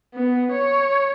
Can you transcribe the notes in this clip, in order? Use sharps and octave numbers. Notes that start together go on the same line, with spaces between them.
B3
C#5